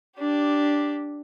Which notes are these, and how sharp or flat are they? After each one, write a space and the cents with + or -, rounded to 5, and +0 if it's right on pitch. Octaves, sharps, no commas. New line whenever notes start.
D4 -5 G4 +0